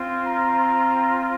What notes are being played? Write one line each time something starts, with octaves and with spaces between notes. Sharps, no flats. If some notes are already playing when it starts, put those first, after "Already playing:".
Already playing: C4 F4
A#5